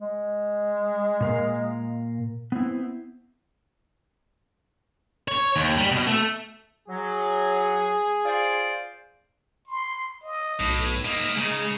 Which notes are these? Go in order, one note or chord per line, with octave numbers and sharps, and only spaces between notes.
G#3
A#2 A#4 F5
B3 C4 E4
C#5
D#2
G3
B2
A3
F#3 G#4
F4 C5 D5
C6
D#5
B1 A2
G#2 A#3 E4 D#5
C#3 G#3 D#4